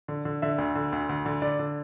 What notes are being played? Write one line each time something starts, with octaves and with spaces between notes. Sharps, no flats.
D3
D3
D3 E5
D2
D3
D2
D2
D3
D3 D5
D3